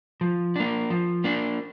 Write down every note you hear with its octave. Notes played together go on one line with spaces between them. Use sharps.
F3
A#3 D4
F3
A#3 D4